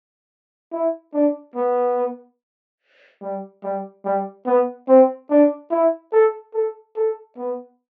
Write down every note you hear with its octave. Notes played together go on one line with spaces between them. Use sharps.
E4
D4
B3
G3
G3
G3
B3
C4
D4
E4
A4
A4
A4
B3